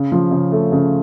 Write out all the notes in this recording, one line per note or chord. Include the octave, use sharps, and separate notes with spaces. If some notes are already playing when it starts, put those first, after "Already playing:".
Already playing: C#3
F3
C#3
A3
C#3